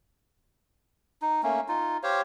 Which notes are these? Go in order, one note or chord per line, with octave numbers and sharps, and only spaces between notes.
D#4
A3 A#3 C#4
D#4 F4
G4 C5 C#5 F5